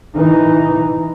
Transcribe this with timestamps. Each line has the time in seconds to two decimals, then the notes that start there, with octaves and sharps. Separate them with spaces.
0.16 E3 D#4